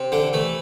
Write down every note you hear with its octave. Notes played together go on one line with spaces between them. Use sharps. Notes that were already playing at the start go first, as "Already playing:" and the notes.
Already playing: C3
D3 D4
E3 A3